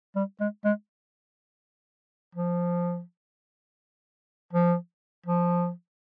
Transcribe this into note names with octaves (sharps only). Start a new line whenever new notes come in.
G3
G#3
G#3
F3
F3
F3